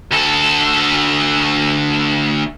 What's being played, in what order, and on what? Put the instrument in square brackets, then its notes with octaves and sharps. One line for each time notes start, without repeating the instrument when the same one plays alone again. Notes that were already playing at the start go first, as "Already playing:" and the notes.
[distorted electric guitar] D2 A4